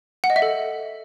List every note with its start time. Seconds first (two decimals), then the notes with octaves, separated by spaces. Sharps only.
0.24 F#5
0.30 D#5
0.36 E5
0.42 A4